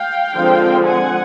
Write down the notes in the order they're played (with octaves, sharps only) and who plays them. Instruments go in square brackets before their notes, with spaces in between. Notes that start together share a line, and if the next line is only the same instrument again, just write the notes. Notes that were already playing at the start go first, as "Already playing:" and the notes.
Already playing: [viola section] F5 G5
D3 F3 G#3 C4
F#5 G#5